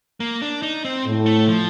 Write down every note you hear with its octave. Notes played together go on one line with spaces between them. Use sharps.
A#3
D4
D#4
C4
A2
A3
F3